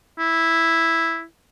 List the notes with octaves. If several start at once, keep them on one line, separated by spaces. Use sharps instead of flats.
E4